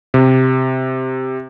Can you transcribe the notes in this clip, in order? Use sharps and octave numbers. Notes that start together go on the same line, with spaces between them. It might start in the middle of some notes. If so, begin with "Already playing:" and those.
C3